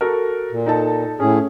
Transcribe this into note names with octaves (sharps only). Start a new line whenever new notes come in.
F#4 A4 A#4
A#2
D#4 A4 A5
A2 C#4 G#4